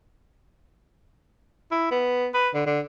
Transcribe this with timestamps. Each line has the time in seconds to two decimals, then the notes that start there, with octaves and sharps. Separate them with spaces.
1.71 E4
1.91 B3
2.34 B4
2.54 D3
2.66 D3